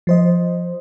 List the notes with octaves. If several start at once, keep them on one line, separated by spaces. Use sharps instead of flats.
F3 C5 D#5